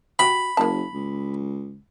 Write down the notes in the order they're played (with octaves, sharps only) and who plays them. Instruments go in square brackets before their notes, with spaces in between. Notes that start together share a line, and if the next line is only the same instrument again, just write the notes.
[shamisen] F#4 G4 [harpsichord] B5
[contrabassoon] F#1 [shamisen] A#3 A5
[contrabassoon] C#2